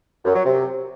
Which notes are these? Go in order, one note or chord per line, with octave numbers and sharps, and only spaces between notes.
F#2
F#3
C3